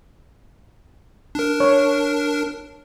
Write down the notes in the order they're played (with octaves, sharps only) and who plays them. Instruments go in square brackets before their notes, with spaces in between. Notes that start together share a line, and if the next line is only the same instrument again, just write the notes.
[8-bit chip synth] D4 A#4
[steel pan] C#5